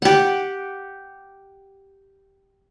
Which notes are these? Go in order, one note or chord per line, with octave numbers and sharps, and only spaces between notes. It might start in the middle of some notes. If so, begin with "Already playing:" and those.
G4 F#5